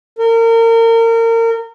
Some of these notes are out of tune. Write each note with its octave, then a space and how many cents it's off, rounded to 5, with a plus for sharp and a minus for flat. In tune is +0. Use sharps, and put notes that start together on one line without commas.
A#4 -30